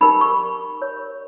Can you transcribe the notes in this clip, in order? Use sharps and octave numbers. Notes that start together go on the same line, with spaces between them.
D#4 G4 A#4 B5
C#6
G4 A#4 C#5